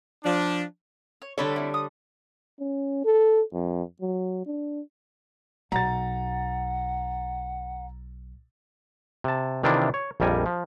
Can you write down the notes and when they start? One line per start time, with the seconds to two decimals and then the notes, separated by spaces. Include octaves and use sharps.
0.24 F3 D4
1.22 C#5
1.38 D3 G3 A4 C#5 B5
1.56 C4 E4
1.74 D#6
2.60 C#4
3.05 A4
3.54 F2
4.01 F#3
4.46 D4
5.72 B1 F#5 A#5 A6
9.24 C3 A5
9.63 C3 D#3 E3 D4 E4 F4
9.94 C#5
10.20 A#1 F2 G3 A#4 G#5
10.46 F3